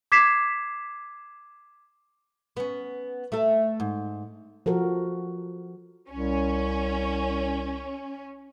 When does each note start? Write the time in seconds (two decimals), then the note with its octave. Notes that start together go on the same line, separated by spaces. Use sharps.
0.12 D6 G#6 B6 C7 E7
2.57 B3 C#4
3.32 A3 A4
3.80 G#2
4.66 F3 F#4 A4 A#4
6.10 C2 C#4